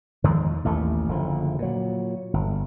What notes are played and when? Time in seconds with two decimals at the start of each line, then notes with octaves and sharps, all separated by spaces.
0.24 E2 D#3 F3 G#3
0.65 A1 D#2 A3
1.09 F#1 D3 F3
1.59 A#2 F#3
2.33 G1